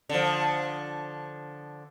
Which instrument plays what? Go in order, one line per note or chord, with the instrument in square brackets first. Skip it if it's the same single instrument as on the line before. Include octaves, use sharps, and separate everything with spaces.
[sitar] D3 F3